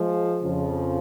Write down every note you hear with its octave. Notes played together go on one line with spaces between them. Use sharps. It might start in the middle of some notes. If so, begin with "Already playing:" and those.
Already playing: F3 G#3
F2 C#3 F3